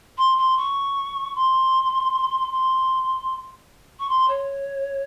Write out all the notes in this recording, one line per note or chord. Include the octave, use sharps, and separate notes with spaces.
C6
C6
C#6
C6
C6
C#6
C6
C#5